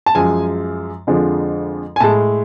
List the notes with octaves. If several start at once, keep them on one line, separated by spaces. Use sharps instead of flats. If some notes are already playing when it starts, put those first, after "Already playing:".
A5
F#2 F3 G#3 G#5
F2 D3 F3 G#3
G#5
A2 G#3 A5